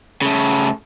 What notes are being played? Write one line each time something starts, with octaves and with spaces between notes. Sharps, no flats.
C#3 A3